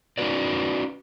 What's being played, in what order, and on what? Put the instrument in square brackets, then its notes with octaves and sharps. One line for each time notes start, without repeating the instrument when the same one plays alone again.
[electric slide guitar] C#4 D#4 F4 F#4 B4 D5